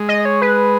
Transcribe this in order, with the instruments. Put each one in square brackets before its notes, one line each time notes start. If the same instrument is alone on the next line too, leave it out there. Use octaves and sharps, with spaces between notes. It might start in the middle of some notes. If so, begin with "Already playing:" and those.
Already playing: [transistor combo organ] G#3
[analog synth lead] D#5
C#5
B4